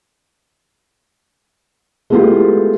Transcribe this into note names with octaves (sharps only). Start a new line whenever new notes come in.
G#3 A3 B3 E4 F4 G4